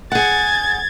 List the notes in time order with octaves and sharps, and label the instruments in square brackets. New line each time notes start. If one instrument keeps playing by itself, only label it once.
[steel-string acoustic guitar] G#4 F#5 [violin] G#6 A6